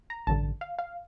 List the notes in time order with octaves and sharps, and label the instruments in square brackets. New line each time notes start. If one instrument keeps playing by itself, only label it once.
[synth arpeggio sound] A#5
A1 G2 D3 A5
F5
F5